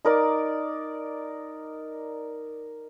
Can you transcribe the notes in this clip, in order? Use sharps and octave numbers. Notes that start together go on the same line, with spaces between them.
D#4 A#4 D5